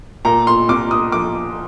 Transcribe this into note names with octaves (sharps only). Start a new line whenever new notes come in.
A#2 A#5
C6
C2 D6
D#6
F3 D6